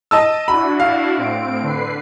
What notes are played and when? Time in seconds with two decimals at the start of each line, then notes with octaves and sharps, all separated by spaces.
0.11 D#5 A5 E6 D#7
0.48 D4 E4 F#4 B5
0.80 F5
1.17 A2 C4 D7
1.62 D3 B4 C7